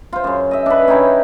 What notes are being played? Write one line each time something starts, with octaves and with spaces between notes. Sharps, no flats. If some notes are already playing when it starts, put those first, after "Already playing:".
F4 C5
F#2 C#3
D#5 E5
D4 B4
C#4 D#4 E4 G5